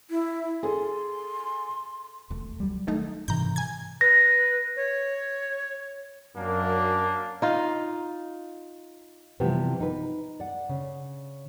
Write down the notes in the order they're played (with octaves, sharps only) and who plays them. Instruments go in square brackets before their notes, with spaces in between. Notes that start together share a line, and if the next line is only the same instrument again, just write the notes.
[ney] E4
[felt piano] G#4 A4 [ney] C6
[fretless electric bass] E1 [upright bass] A3
[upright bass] C#2 [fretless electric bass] F#3 G3
[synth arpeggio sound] D#3 A3 D#4 [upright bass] A#3
[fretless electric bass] G#2 E3 [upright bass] C3 D#3 [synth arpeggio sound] A#5 G6
[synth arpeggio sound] G#5 G#6
[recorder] B4 [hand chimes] A#6
[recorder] C#5
[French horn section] F#2 [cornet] A#3 [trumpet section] D4
[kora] D#4 F4
[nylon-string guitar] C3 E3 F3 G3 B3 C4
D#4 B4
D5 F#5
C#3